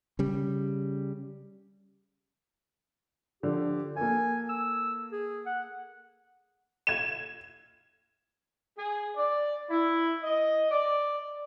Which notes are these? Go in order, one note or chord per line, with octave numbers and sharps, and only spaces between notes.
C#3 G3
D3 F3 G4
A#3 A4 G#5
E6
G#4
F#5
G#6 E7
G#4
D5
E4
D#5
D5